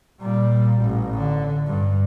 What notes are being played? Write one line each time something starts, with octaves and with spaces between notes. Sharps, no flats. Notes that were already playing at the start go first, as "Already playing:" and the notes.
A#2 G3
A1
D3
G2